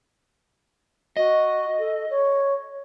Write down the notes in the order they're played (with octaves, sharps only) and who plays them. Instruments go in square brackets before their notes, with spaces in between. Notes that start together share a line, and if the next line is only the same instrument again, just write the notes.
[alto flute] F#4 [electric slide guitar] D#5
[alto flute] A4
C#5